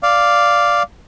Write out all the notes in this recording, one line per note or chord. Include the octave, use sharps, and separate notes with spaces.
D5 F5